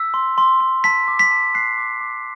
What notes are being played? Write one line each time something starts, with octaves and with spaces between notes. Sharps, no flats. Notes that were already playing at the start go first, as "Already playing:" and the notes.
Already playing: E6 B6
C6
C6
C6
A5 B6
D6
B6
A5
F#6 C7
D6
D6